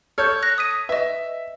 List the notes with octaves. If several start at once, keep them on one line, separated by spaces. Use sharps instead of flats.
A4 C#5 F6 G6
F#6 A#6
D#6 B6 D#7
B4 D#5 E5